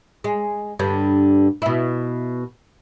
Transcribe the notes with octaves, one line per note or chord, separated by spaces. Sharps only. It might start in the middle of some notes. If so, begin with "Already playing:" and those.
G#3
G2 D3
B2 E4